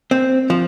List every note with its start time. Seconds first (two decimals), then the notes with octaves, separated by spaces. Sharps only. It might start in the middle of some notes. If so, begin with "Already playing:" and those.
0.11 C4
0.50 F3